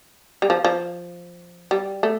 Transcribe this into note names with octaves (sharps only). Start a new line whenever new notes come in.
G3
F3
F3
G3
A3